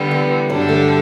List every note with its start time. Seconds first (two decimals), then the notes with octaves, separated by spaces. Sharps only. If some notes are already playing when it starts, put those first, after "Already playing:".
Already playing: D3 G3 B3
0.11 E3
0.49 G2 D3 F#3 G3 D4 A4
0.69 A3